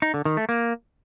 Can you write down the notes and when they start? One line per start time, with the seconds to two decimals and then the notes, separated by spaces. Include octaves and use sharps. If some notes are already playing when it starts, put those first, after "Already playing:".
0.02 D#4
0.14 D3
0.25 D#3
0.37 A3
0.49 A#3